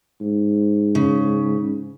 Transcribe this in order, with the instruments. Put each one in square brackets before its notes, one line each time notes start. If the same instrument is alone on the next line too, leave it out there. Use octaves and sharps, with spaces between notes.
[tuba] G#2
[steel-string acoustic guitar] C#3